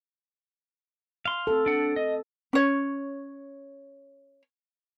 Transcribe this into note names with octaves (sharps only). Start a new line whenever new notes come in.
F5 C6
C4 A4
D4 F#5
D#5
C#4 C#5